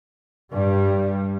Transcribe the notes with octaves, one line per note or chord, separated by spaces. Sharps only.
G2 G3